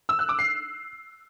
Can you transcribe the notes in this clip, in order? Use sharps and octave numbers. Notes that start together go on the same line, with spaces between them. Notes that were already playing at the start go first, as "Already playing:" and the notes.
E6
F#6
D6
C7